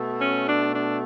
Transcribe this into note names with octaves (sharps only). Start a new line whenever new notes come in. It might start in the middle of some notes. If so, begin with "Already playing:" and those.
Already playing: B2 A3
C#4
D4
D4